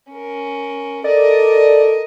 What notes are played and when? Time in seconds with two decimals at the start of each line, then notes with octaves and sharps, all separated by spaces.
0.12 C#4 A#4
1.04 A4 A#4 D5 D#5